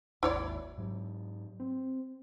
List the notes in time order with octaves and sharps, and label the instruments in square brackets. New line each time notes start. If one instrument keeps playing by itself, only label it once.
[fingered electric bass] G#1 D#2 [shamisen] E4 C#5 D5
[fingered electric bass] G#2 F#3
C4